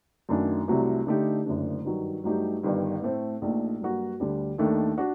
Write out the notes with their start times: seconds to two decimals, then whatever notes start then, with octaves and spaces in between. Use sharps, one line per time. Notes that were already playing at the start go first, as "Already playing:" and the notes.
0.29 F#2 D#3 A3 D4 F#4
0.68 C2 C3 F#3 A3
1.07 D3 A3 D#4 G4
1.46 F#1 F#2 D3 A3 D4
1.85 G2 D#3 F#3
2.24 G2 F#3 A3 D#4 G4
2.63 G1 G2 D#3
3.02 A2 A3 C4
3.42 A#1 A#2 A3 D#4
3.80 G2 F#3 A#3 F#4
4.20 D2 D3 G3
4.58 D#2 D#3 A3 D4 A4
4.98 D4 F#4